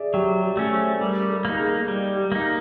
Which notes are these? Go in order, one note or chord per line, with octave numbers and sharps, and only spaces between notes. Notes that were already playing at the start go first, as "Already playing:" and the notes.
Already playing: G#4 D5 E5
F#3 G4
G4
A3 C#4
C5
G3 A#4
A4
A#3 D#4
G#4
G3
G4
A#3 D#4